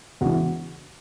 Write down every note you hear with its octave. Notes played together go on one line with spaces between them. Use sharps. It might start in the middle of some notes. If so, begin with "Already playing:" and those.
E2 C#3 E3 F#4